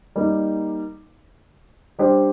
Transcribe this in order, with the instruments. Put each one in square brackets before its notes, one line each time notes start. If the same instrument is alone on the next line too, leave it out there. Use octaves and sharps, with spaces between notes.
[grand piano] G3 A#3 D#4 A#4
G3 D4 G4 C5